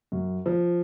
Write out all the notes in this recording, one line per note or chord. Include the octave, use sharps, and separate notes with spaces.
F#2
F3